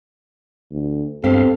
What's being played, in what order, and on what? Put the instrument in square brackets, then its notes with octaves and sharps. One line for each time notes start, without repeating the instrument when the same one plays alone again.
[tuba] D2
[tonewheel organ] G2 F5 [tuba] B3 [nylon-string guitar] C4 G4 [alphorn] A4